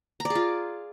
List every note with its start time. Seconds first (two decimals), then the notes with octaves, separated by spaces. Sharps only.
0.20 A#5
0.25 D5
0.30 G#4
0.35 F4